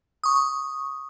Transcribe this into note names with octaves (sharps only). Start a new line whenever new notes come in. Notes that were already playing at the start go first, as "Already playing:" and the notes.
C#6 D#6